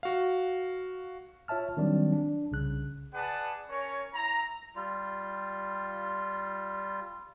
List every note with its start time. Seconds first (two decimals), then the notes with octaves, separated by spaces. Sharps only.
0.03 F#4 F5
1.48 F4 C#5 E5 A5 F6
1.77 D#3 F#3 G3 C4 D4 D5
2.13 D4
2.51 C2 C#3 F#6
3.14 G#4 B4 D5 F#5 A5
3.69 C#4 A#4 C#5
4.14 E4 A#5
4.75 G3 F4